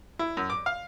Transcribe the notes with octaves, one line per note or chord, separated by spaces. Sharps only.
E4
F#2
D6
F5